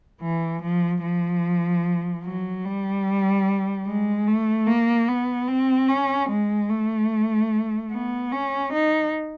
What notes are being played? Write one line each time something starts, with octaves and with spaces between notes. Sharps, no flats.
E3
F3
F3
F#3
G3
G#3
A3
A#3
B3
C4
C#4
G#3
A3
B3
C#4
D#4